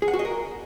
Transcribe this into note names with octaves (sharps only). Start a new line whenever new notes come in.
G#4
F#5
F#4
D#5
A#4